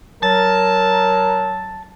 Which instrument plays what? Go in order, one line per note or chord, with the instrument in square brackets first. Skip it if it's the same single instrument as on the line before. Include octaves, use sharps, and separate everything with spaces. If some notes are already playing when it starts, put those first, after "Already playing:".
[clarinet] F#3 [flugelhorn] A#4 [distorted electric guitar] A5